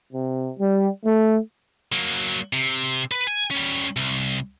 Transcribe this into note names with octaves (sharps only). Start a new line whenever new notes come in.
C3
G3
A3
F#3 A#3
C3
B4
G#5
G3 C#4
C2